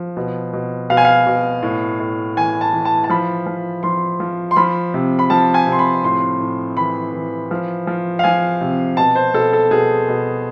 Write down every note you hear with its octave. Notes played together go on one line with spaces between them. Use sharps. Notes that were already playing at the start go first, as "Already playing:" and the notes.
Already playing: F3
B2
B2
B2 F5
G#5
F5
B2
A2
A2
E3 G#5
A5
E3
A5
A5
F3 B5
F3
F3 C6
F3
C6
F3 B5
C3
B5
F3 A5
G#5
C3
C6
B5
A2 C6
A2
E3 B5
E3
F3
F3
F5
F3 G#5
C3
B2 A5
C5
B2 A4
A4
B2 G#4
B2